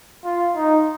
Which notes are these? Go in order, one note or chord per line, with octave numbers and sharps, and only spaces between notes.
F4
D#4